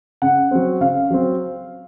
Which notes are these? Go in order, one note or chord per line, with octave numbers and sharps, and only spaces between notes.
C#3 F#5
F#3 C4
C#3 F5
F#3 C4